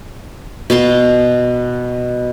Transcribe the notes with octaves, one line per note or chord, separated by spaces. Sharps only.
B2 F5 C6